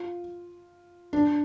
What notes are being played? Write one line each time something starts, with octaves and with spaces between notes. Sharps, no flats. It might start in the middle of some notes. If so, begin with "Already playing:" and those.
Already playing: F4
D4